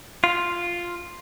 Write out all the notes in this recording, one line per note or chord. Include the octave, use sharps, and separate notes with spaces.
F4